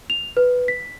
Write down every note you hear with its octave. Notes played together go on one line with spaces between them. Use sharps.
F7
B4
B6